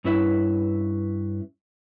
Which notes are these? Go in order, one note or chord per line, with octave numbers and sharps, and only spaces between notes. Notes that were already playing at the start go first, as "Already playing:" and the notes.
G2 C#4 E4 B4 E5